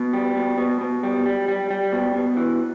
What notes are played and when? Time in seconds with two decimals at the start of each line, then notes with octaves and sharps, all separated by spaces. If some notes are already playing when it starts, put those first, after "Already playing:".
Already playing: B2
0.13 G3
0.36 B2
0.58 B2
0.81 B2
1.03 G3
1.26 G3
1.48 G3
1.71 G3
1.93 B2
2.15 B2
2.37 E3